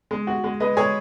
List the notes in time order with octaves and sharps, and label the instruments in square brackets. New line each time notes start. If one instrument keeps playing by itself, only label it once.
[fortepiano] G#3
F#4
G#3
[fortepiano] G#3 [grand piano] B4 D#5
[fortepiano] G#3 [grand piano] G#4 C#5